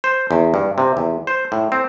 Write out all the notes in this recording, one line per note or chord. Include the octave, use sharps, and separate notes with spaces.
C5
E2
G2
C3
E2
C5
A2
C4